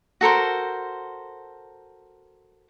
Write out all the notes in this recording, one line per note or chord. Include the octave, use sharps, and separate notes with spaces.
F#4 A4 A#4 C5